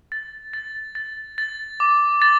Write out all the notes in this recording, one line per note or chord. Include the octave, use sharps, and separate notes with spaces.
A6
A6
A6
A6
D6
A6